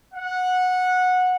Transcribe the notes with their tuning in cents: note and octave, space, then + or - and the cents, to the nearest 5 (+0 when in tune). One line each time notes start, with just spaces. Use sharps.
F#5 -15